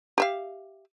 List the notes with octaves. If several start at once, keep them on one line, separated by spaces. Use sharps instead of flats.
G4 E5 F5